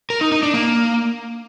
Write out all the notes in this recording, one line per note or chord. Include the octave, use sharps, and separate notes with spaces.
A#4
D#4
D#4
D4
A#3